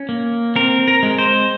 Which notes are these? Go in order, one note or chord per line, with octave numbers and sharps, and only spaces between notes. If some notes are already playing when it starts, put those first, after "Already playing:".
Already playing: C#4
A#3
C4 A#4
A#4
G#3
C5